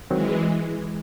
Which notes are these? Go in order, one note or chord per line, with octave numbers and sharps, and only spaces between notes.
D#3 E3 F#3 G#3 C4